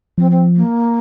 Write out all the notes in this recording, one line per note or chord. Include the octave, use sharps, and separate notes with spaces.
F3 C4
C4
A#3